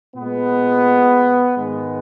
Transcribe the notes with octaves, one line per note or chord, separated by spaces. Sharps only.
A#2 G#3 B3
G#2 D#3 G#3 B3